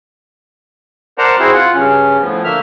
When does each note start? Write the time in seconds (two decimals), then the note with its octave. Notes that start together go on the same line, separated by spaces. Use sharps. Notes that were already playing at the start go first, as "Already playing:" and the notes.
1.18 A#4 C5 D5 F#5 A5 A#5
1.39 C4 E4 F#4 G#4 C5
1.55 F4 F#5
1.74 G2 C#3 C#4
2.21 A2 F3 B3
2.44 D3 A3 A#3 E5 F6